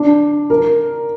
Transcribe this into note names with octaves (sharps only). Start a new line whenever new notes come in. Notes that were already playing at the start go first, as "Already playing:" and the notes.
Already playing: D4
A#4